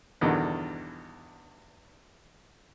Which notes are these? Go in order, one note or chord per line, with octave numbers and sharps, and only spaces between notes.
E2 G2 B2 D3 D#3